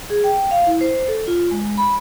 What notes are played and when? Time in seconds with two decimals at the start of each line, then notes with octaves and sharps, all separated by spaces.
0.10 G#4
0.24 G5
0.51 F5
0.67 E4
0.81 C5
1.08 A4
1.27 F4
1.51 G#3
1.77 B5